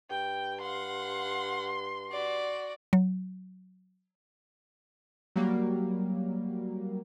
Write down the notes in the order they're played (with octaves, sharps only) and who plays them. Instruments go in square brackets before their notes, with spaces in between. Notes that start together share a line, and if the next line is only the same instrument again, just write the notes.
[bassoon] G2 [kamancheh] G5
[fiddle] F5 F#5 [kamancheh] C6
[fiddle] F#4 D5
[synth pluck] F#3
[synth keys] F#3 G3 A#3